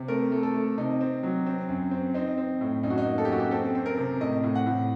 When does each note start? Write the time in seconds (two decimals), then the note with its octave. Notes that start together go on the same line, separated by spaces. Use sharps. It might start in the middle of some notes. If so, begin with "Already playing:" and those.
Already playing: C3
0.08 A3 A#4
0.32 A3
0.43 A4
0.54 A3
0.78 C3 D#4
1.01 C4
1.23 F#3
1.46 C4
1.69 F#2
1.91 C4
2.14 C4 D#4
2.38 C4
2.61 A2
2.83 F#2 D#4
2.90 F#4
2.98 D#4
3.06 A#3
3.18 A4
3.25 G4
3.29 F#2 F#4
3.40 G4
3.51 C4 A4
3.75 C4
3.86 A#4
3.98 C3
4.21 A2 D#5
4.43 A2
4.55 F#5
4.66 A2